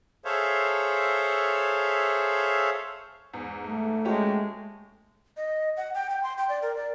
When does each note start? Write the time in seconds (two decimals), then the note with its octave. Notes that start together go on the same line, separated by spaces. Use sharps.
0.25 G#4 A4 C5 C#5 E5 F5
3.33 E2 G#2
3.67 A3
4.05 G#3 C#4 F#4 G4
5.37 D#5
5.77 F#5
5.95 G5
6.10 G5
6.23 C6
6.38 G5
6.49 D5
6.62 A#4
6.77 D5